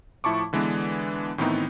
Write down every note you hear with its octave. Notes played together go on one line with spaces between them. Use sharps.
A2 F3 E4 A5 C#6 D6
D3 E3 G#3 B3 D4
A2 D#3 E3 B3 C4 D#4